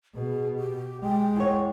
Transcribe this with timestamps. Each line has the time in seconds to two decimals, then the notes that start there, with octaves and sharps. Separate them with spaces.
0.15 B2 G#4
0.57 G4
1.02 G#3 G5
1.36 E2 C#5